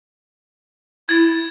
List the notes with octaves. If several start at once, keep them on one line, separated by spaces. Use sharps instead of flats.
E4 G#6 A6